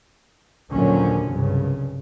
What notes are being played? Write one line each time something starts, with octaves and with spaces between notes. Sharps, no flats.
A#1 D#2 D3 F3 F#3 C#4
C2 G2 C#3